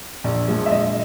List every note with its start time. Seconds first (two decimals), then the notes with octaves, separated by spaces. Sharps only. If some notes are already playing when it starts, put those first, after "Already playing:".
0.24 A#1
0.48 A#2 F3 G#3
0.66 E5
0.71 A#1 D#5